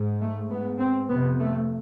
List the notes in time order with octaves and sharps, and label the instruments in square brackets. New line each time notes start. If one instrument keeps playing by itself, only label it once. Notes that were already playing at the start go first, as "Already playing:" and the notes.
Already playing: [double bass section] G#2
A3
G#2 B3
C4
F2 C3 B3
A3